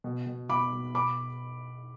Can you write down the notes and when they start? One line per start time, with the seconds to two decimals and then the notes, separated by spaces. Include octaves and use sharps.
0.04 B2
0.27 B2
0.49 B2 B5 D6
0.73 B2
0.94 B2 B5 D6